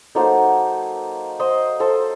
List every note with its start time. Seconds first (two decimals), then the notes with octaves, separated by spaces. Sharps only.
0.15 F#3 A#3 D#4 A4 C5
1.40 C5 D#5
1.80 A4 C5